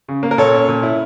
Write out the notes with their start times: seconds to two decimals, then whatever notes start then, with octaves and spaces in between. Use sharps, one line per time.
0.08 C#3
0.23 A#3
0.31 A#4
0.38 A#2 A4 C#5
0.54 C#4
0.69 A#2
0.83 E4